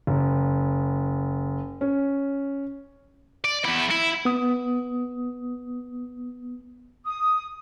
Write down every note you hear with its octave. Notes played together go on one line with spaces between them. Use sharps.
F#1
C#4
D5
E2 E4
E4
B3 D#6
D#6